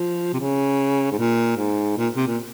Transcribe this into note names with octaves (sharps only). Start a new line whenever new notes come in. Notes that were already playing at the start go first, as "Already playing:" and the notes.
Already playing: F3
C3
C#3
G#2
A#2
G#2
A#2
C3
A#2